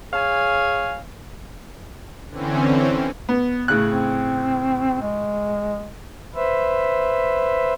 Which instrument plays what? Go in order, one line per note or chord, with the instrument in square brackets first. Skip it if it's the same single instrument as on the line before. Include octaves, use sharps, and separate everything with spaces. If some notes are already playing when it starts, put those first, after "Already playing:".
[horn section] G#4 C#5 F5 G#5
[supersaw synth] D3 E3 C4 C#4
[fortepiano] B3
A2 C#3 F#6
[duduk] C4
G#3
[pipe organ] B4 C5 E5